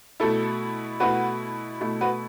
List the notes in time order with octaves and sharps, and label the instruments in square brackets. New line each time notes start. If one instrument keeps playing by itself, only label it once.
[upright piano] B2 A3 E4 A4
B2 A3 E4 F#4 B4
B2 A3 E4
F#4 B4